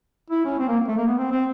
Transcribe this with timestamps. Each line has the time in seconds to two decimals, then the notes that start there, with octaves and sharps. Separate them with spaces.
0.30 E4
0.45 C#4
0.59 C4
0.68 A#3
0.88 A3
0.97 A#3
1.07 B3
1.18 C4
1.31 C4